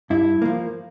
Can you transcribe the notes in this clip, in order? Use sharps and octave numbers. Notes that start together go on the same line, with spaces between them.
G2 E4
F3 A#3